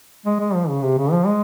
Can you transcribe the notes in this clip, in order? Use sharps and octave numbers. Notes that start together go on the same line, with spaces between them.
G#3
G#3
F3
C#3
C3
C#3
F3
G#3